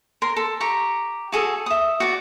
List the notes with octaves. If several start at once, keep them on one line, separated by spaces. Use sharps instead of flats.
A#4 C6
A4
G4 A#5 C#6
F#4 G#4 A4
E5 D#6
F#4 D5